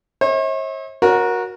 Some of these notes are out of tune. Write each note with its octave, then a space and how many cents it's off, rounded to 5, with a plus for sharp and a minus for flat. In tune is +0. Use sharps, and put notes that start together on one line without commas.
C#5 -45 E5 -45
F#4 -15 A#4 +15 C#5 -10